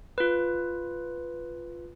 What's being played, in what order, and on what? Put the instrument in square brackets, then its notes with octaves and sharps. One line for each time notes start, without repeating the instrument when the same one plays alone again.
[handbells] F4 B4